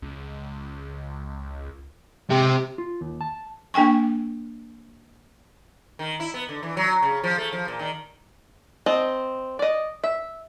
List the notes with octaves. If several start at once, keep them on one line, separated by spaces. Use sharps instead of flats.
C#2
C3 G#3 G4
F4
D#2
A5
A#3 D4 G5 G#5 C#6
D#3
E4
B3
D3
E3
F#3
C#3
F3
A3
F3
A#2
D#3
C4 D#5 A5
D5 D#5
E5